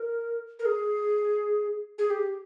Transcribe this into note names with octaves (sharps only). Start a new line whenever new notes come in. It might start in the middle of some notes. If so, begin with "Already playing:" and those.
Already playing: A#4
A#4
G#4
G#4
G4